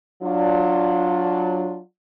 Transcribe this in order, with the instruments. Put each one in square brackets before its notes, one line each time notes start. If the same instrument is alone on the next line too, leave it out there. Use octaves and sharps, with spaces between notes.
[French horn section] F#3 D4 F4